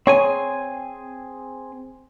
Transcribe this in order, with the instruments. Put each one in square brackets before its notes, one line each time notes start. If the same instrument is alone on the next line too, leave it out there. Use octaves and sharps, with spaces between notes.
[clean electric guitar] C4 G#4 G#5 [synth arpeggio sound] C#5 A#5 C#6